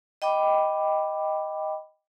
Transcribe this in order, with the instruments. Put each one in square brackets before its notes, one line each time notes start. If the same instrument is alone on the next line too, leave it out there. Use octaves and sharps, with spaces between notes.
[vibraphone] D#5 G5 B5 D6